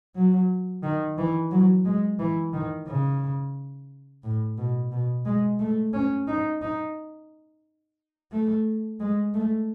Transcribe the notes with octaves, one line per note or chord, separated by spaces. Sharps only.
F#3
D#3
E3
F#3
G#3
E3
D#3
C#3
A2
B2
B2
G#3
A3
C#4
D#4
D#4
A3
G#3
A3